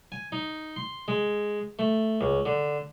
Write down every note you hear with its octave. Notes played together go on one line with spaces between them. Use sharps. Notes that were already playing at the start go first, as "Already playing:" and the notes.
G#5
D#4
C6
G#3
A3
C#2
D3